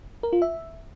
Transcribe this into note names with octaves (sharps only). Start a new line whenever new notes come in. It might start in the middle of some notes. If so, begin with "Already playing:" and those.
A#4
F4
E5